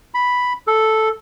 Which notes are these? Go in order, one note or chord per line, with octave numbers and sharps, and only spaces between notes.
B5
A4